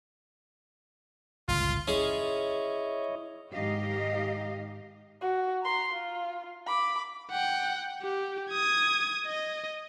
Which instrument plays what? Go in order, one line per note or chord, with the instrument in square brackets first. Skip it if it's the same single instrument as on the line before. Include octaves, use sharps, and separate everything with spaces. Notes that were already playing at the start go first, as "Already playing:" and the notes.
[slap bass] G1 C#2 A#2 [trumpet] F4
[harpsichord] C#4 G#4 [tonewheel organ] E4 C#5 D#5
[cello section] G#2 D#3 D#4 G4 D#5 F5
[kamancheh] F#4
A#5 C6
F4
B5 D6
[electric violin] F#5 G5
G4
D#6 G#6
D#5